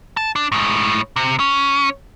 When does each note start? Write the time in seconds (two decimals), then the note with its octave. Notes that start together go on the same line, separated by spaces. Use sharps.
0.17 A5
0.36 D4
0.52 A2 G#3
1.16 C3
1.40 C#4